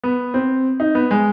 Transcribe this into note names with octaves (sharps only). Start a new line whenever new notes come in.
B3
C4
D#4
B3
G#3